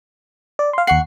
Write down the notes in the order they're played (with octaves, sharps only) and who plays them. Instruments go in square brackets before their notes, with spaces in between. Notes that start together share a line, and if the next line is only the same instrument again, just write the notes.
[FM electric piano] D5
F5 C6
[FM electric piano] D#2 C7 [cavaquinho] F#5 C#6